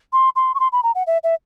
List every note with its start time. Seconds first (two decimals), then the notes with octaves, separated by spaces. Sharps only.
0.13 C6
0.36 C6
0.55 C#6
0.60 C6
0.72 B5
0.83 A#5
0.95 F#5
1.07 E5
1.24 E5